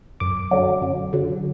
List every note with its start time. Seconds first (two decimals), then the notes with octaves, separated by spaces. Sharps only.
0.20 F#2 D6
0.51 D3 F#3
0.81 F#2
1.13 D3 F#3